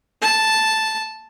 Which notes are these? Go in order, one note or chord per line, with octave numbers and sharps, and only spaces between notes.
A5